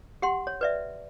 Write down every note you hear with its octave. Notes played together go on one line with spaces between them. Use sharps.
G4 F#5 C6
C#5
B4 D5 E5